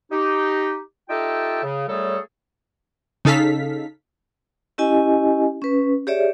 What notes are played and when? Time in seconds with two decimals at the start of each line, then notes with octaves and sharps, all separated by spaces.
0.12 D#4 G4
1.10 D#4 F4 G4 A4 E5 G5
1.63 C#3
1.88 F#2 G3 A3 G#4 A4 C#5
3.25 C#3 D#4 A4 F5 B6
4.78 C#4 E4 G4 D#5 G#5
5.62 C#4 B4
6.07 G4 G#4 C#5 D5 E5